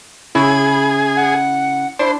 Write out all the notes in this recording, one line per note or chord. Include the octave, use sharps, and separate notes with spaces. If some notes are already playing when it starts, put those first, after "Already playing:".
C#3 E4 G#4 B5
F#5
D4 E4 C5